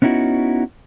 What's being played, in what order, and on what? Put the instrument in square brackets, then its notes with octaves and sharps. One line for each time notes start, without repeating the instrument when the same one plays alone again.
[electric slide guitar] B3 C#4 D#4 E4 F#4